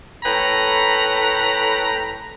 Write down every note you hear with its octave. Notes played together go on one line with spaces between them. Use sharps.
A2 A4 B4 C#5 G5 A#5